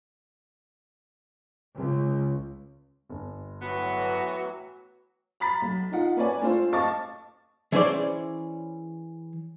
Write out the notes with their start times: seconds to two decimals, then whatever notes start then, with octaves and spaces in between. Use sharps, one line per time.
1.75 C#2
3.09 G1
3.61 A2 E3 F#3 B3 F#4
5.40 A#5 B5 A6 B6
5.61 B1
5.92 D#4 F4 F#5
6.16 A#3 B4 C#5 D5 G#5
6.42 A3 D4 F4 C5
6.73 D#5 F5 A5 C#6 D6 A6
7.72 E3 C#4 G#4 C5 D5